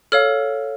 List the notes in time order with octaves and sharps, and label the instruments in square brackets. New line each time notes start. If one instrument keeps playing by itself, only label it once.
[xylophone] A4 C#5 F5 F6